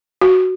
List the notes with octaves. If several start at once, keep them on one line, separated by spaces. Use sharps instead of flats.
F#4